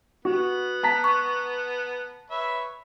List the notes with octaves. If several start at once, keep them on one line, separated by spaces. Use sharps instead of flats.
B3 F#4
A5 A#5 B6
C#6
B4 C#5 E5